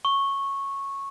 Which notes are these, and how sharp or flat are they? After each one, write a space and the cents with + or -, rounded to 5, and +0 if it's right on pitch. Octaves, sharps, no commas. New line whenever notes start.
C#6 -10